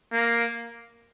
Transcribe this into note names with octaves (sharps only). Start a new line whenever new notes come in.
A#3